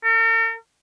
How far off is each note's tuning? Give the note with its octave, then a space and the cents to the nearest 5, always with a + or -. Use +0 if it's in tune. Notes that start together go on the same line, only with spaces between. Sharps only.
A#4 -45